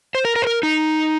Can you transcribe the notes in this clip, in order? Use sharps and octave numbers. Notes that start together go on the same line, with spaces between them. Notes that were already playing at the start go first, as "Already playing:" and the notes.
C5
A#4
A#4
C5
A#4
D#4